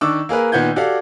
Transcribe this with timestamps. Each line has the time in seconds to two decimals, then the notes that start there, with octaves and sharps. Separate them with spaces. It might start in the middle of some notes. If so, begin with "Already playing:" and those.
0.01 D#3 D4 C#6 D6 E6
0.29 A#3 G#4 A#4 B4
0.52 A#2 D#3 B3 F#5 G6 G#6
0.76 F#4 G4 A4 D5 F5